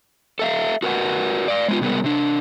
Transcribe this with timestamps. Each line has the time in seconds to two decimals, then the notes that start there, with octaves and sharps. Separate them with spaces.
0.39 A4 E5 F5
0.83 F#4 A#4 B4 D#5 F#5
1.48 D5 F5
1.68 G#3 B3 D#4 F4
1.81 C3 G3 G#3 B3 A#4
2.04 C3 D4